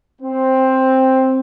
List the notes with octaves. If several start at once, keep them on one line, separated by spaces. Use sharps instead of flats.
C4